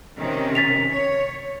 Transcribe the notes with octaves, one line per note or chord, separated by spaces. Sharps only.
C3 D#3 C#4
A6 B6 F7
C#5